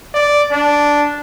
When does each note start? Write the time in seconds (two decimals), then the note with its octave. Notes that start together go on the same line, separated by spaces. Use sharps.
0.15 D5
0.52 D4